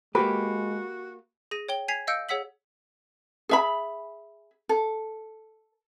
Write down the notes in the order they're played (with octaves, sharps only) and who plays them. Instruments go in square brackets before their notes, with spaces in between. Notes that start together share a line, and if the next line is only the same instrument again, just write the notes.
[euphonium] G#3 [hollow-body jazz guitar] A#3 G4 [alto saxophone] F#4 [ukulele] B4
[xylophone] G#4 A#6 D#7
C#5 G5 G7
G#5 G#6 B6 C7 F7
D#5 F5 E6 G6 C#7 D7
G#4 C#5 F#5 E6 B6 F#7
[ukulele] G#4 E5 B5
A4